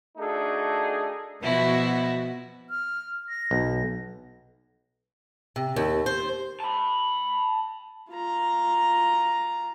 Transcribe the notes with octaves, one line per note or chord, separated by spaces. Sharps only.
A3 D4 D#4 F#4 G#4 A4
B2 F3 E4 F#4
F6
A#6
B1
C3
D#2
C5
A5 B5
F4 A#5